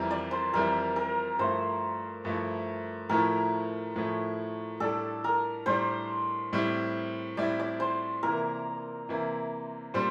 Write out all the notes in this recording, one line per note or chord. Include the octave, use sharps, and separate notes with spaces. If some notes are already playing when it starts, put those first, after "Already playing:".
Already playing: F2 E3 G3 C4 E4 A#4
D5
C5
F2 E3 G3 C4 E4 A#4
A#4
G2 F3 A3 E4 C5
G2 F3 A3 E4
A2 F3 A3 E4 A#4
A2 F3 A3 E4
A2 G3 D4 A4
A#4
A2 G3 D4 C5
A2 G3 C4 E4
A2 G3 C4 E4 D5
D5
C5
C3 E3 A#3 E4 A#4
C3 E3 A#3 E4
A#2 G3 C4 C5